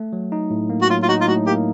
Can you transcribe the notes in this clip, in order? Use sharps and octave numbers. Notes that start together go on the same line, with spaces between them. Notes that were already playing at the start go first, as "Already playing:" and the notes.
Already playing: A3
F#3
D#4
A2
A#3
F#4
F#3 F4
F4
D#4 F#4
F4
A2 F#4
A#3 G4